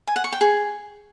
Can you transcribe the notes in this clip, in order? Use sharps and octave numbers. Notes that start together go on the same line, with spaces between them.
G#5
F#5
C#6
G5
G#4